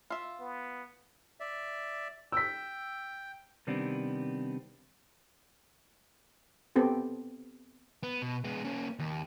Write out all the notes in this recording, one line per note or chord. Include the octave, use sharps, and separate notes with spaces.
F4 E5
B3
D5 E5
G5 E6 B6
C3 D#3 G3 B3 C4 D4
B3 C4 G4 A4
B3
B2
G#3 B3
A#3 C#4
D#2